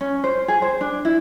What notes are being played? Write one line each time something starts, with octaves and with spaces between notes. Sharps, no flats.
C#4
C5
G#4
C5
D4
E4